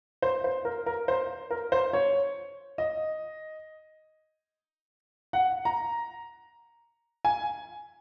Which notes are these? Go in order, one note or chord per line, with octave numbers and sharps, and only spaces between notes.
C5
C5
A#4
A#4
C5
A#4
C5
C#5
D#5
F#5
A#5
G#5